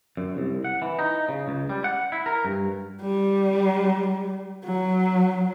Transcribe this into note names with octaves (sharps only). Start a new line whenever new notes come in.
F#2
C2
F#5
E3
D#4
C#3
C#2
G3
F#5
E4
A#4
G2
G3
F#3